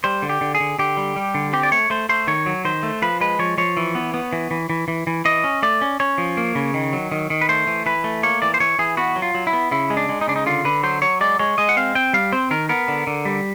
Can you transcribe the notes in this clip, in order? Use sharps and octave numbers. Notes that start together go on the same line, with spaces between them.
G3 C5
D3
G4
D3
G#4
D3
D3 G4
G3
G3
D3
C4 G4
D5
A3 C#5
A3 C5
A3 C5
D#3 C#5
F#3
D#3 C5
A3
F3 B4
G#3 B4
F3 C#5
F3 C#5
E3
B3
B3
E3
E3
E3
E3
E3
E3 D#5
C#4
A3 D5
C#4
C#4 C#5
F3
A#3
C#3
D#3
F#3
D#3
D#3
B4
A3 C5
E3
E3 B4
A3
A#3 C#5
E3 D5
C5
E3 C#5
E3 G#4
B3 F#4
F#3
F4
F#3
E4
B3
C#3 E4
G#3
D4
G#3
D#4
C#3 D4
D#4
D3 F4
D3 B4
F#3 C5
F#3 C#5
G#3 D5
G#3 C#5
G#3 D#5
F#5
C4 F5
C4 G5
G3 F5
C4 C5
D#3 A#4
B3 A#4
D3
D3
G3